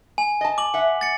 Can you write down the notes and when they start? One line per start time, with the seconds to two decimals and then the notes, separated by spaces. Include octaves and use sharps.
0.18 G#5
0.41 D#5 A5
0.58 D6 F#7
0.74 E5 F#5
1.01 A6 C#7